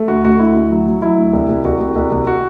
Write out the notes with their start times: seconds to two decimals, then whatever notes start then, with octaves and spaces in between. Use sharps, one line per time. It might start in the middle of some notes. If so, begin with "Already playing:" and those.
Already playing: A3
0.08 D2 F#4
0.24 D2 F#4
0.39 D2 E4
0.56 D2
0.70 F#3
0.86 F#3
1.02 F#3 E4
1.17 D2
1.33 C2
1.49 C2
1.65 C2 F#4
1.80 C2
1.96 C2
2.12 C2
2.27 F#4